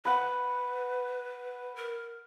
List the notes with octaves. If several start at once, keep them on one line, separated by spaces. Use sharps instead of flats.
B4 F#5 B5
A#4